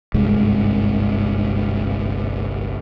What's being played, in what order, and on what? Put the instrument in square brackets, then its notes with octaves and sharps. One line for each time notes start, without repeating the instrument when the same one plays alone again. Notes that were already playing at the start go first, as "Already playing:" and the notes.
[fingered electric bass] G1 C2 G#2 G#3